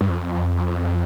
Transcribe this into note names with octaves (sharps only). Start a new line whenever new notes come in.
G2
F2